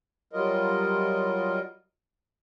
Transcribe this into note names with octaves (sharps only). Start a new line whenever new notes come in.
F#3 G3 F4 A#4 D#5